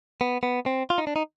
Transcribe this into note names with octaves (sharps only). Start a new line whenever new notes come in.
B3
B3
C4
F4
D#4
D4
D#4